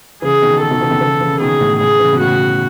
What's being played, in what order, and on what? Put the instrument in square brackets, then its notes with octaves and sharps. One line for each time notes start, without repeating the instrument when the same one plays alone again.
[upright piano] C#3 E3 [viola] G#4
[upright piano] B2 D#3
[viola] A4
[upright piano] B2 D#3
C#3 E3
B2 D#3
C#3 E3
C#3 E3
[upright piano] B2 D#3 [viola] G#4
[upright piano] A2 C#3
[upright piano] A2 C#3 [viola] G#4
[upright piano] C#3 E3
B2
[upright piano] A2 C#3 [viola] F#4